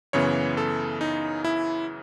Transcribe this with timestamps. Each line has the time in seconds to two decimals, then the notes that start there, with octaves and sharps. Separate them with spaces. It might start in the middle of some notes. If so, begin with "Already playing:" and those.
0.13 F#2 C#3 E3 B3 C#5
0.57 A4
1.01 D#4
1.44 E4